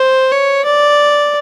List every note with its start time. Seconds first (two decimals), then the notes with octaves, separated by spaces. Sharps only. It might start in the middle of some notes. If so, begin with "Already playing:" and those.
Already playing: C5
0.31 C#5
0.65 D5